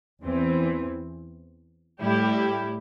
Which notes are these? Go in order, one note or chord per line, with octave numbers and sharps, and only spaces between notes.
E2 E3 C4
A2 G3 E4 G4